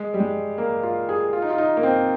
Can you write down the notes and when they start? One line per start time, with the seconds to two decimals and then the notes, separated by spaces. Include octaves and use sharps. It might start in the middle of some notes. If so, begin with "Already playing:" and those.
Already playing: G#3
0.14 G3
0.20 G#3
0.58 A#3
0.83 F4
1.09 G#4
1.33 F4
1.42 D#4
1.50 F4
1.58 D#4
1.77 A#3
1.83 C4